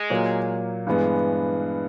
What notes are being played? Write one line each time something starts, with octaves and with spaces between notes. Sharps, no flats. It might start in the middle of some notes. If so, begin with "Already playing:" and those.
Already playing: G#3
A#2 F#3 A#3
G2 E3 G#3 B3